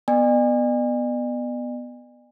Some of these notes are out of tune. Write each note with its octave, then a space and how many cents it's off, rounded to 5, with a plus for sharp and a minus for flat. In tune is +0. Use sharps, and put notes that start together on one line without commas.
B3 +0 D5 +45 G#5 -35